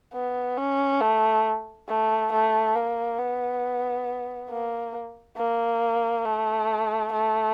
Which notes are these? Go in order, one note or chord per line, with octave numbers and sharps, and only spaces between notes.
B3
C#4
A3
A3
A3
A#3
B3
A#3
A#3
A3
A3